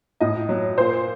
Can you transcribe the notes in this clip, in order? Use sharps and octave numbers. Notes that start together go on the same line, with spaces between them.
A2 D#5
F#3
A#2 C5